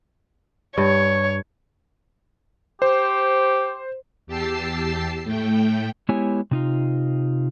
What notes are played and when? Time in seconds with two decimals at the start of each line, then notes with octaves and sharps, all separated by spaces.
0.78 G2 C#5
2.82 G4 C5
4.27 E2 G4 A5 E6 C7
5.24 A2 A3 G5
6.09 G#3 B3 E4 G4 C#5 G#5
6.51 C3 D#4 F4